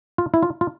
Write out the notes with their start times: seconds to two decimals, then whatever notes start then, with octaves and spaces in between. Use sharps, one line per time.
0.18 F4
0.34 E4
0.43 F4
0.61 F4